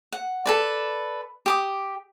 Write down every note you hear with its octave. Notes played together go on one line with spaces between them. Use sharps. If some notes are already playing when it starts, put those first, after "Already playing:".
F#5
A4 B4 D5
G4 D6 D#6